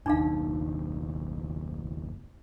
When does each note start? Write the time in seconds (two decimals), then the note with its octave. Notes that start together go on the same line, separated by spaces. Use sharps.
0.06 F#1 D#2 D4 D#4 F5